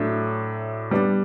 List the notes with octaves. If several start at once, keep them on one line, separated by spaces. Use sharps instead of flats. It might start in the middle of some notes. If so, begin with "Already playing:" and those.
Already playing: A2 F#3 A3 D4
G3 B3 D4